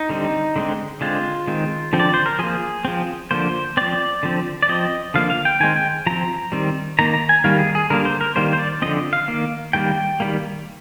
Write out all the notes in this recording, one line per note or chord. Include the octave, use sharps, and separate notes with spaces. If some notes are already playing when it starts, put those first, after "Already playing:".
Already playing: D#4
D3 G3 C4
D3 G#3 C4
D3 G#3 C4 F4
D#3 G#3 C4
D3 F3 C4
D5
C5
A#4
F3 A#3 G#4
F3 C4
D3 F3 A#3 C5
F3 C4 D5
D3 F3 C4
D5
F3 C4 D#5
D3 F3 A#3 F5
F5
G5
D#3 G#3 C4 G#5
G5
F3 C4 A#5
D#3 G3 C4
D#3 A#3 A#5
A#5
G#5
D#3 G3 A#3 F5
G#4
G#4
D3 G3 A#3 A#4
C5
A#4
D#3 G3 A#3 C5
C5
D5
D3 F3 C4 D#5
F5
D#3 A#3
D#3 G3 A#3 G5
D#3 G3 A#3